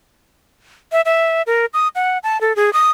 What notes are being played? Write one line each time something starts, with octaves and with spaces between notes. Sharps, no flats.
E5
E5
A#4
D#6
F#5
A5
A4
G#4
D#6